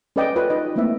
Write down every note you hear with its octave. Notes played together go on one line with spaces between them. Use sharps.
C#4 A4 B4 D5 D#5 G5
F4 G4 A4 B4 C#5 D5
D#4 D#5
A3 A#3 C4 E4 E5